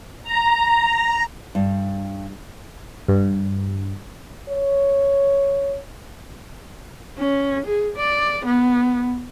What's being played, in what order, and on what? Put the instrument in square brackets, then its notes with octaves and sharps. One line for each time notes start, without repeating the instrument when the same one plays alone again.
[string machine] A#5
[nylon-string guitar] G2
[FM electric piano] G2
[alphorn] C#5
[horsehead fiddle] C#4
G#4
D5
B3